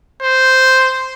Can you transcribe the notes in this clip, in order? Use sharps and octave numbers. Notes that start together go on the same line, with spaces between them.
C5